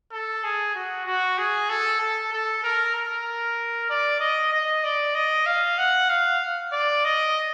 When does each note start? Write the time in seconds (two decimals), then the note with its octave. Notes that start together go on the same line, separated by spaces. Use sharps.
0.12 A4
0.43 G#4
0.75 F#4
1.05 F#4
1.38 G#4
1.69 A4
2.00 A4
2.32 A4
2.63 A#4
2.95 A#4
3.90 D5
4.20 D#5
4.52 D#5
4.84 D5
5.14 D#5
5.46 F5
5.78 F#5
6.09 F5
6.72 D5
7.04 D#5